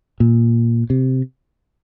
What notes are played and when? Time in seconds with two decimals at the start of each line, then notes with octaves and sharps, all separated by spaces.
0.20 A#2
0.90 C3